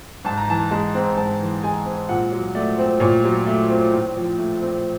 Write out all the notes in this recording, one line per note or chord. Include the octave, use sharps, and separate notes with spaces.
G#2 A5
A#5
E3 A5
G#3 A5
C4
G#2 A5
E3
G#3 G#5
C4
A#2 F#5
F#3
A3 D5
C4
A#2 C#5
F#3
A3
C4
A2
F3
A3
C4